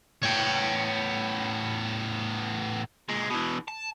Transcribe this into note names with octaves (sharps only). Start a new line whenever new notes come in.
A2 B3 C#5 G5
A#2 G#3
B2 E3
A5